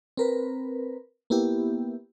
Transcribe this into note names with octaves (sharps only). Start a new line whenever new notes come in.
C4 A#4 B4
A#3 B3 E4 G4